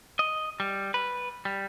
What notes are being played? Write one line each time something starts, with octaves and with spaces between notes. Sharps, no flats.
D#5
G3
B4
G3